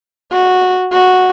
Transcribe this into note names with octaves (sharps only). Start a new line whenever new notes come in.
F#4
F#4